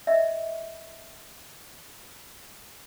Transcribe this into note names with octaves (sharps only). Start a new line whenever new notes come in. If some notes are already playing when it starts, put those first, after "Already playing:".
D#5 E5